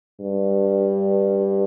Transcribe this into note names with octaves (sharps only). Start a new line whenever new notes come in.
G2